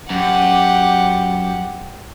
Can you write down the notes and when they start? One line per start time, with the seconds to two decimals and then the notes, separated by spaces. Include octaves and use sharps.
0.10 F#2 G4 F#5